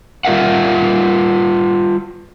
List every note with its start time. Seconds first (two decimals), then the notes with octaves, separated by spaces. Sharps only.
0.25 G3 F4 A#4 D5 E5 F#5